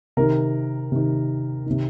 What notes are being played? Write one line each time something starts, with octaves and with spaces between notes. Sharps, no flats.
C3 D#3 A#4
C3 D#3
C3 D#3